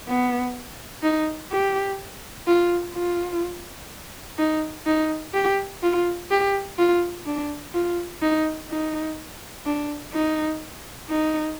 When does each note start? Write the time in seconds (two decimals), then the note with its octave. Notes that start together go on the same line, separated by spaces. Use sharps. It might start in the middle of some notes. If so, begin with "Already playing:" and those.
0.08 B3
1.03 D#4
1.52 G4
2.47 F4
2.95 F4
4.38 D#4
4.86 D#4
5.35 G4
5.83 F4
6.31 G4
6.79 F4
7.26 D4
7.74 F4
8.22 D#4
8.70 D#4
9.66 D4
10.13 D#4
11.10 D#4